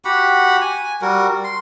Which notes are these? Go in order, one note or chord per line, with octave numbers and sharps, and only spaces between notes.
F#4 G4 F#5 B5
G#5
G3 F#4 A#4
C6